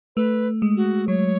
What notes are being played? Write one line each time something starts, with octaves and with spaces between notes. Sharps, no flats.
A3 B4
G#3
F#4
F#3 C#5